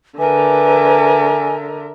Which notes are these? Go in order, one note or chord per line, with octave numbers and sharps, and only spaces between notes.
D3 A#4 B4 E5 G#5